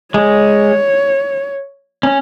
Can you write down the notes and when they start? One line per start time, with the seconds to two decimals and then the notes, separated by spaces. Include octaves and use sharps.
0.14 G#3 C#5
2.03 C#4